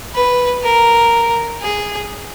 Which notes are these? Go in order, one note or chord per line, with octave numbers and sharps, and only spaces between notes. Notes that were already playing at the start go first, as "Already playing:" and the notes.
B4
A#4
G#4